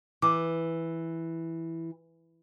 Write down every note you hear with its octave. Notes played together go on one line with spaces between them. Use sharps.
E3 D6